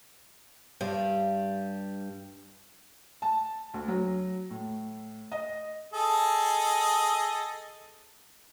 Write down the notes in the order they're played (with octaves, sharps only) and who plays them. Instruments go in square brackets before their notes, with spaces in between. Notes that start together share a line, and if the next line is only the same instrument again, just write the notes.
[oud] G2 G3
[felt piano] A5
D2
F#3
A2
D#5
[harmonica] G#4 A4 D#5